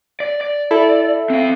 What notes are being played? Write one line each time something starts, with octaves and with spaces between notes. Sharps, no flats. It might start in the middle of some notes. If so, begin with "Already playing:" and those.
D5
D5
E4 A4
C4 F5